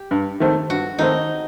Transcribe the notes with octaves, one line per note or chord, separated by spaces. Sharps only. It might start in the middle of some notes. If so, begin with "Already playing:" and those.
Already playing: G4
G2
D#3 A3 C4
G2 F#4
D#3 A3 C4 D#4